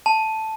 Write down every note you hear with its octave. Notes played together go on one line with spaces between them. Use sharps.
A5